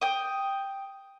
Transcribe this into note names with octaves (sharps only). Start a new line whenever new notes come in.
G5 D#6